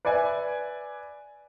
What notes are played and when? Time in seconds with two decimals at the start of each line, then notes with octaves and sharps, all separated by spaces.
0.05 B4 D5 E5 G#5